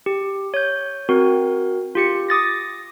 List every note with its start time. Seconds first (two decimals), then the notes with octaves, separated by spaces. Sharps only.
0.06 G4
0.54 C#5 G6
1.09 C4 F#4 A#4
1.95 F4 G4 C#7
2.29 D6 D#6 A6 A#6